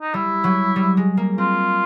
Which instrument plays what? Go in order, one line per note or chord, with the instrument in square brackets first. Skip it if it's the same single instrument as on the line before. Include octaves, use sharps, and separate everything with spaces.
[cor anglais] D#4
[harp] G3 [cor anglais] E4
[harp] F#3
G3
G#3
A#3
[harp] C4 [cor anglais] F4